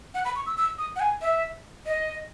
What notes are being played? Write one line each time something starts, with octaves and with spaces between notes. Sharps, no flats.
F#5
B5
C#6
E6
E6
D#6
F#5
G#5
E5
D#5